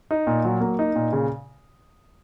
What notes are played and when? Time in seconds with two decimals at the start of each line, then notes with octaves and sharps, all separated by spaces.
0.11 D#4
0.27 A#2
0.45 F#3
0.61 A#3
0.79 D#4
0.96 A#2
1.13 C#3